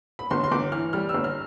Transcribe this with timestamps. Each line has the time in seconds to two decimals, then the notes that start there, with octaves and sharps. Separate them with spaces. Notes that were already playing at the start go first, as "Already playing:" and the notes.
0.19 B5
0.31 G1 C6
0.44 C6
0.52 G1 D6
0.72 E3 F6
0.93 G3 F6
1.09 E6
1.14 G1
1.24 F6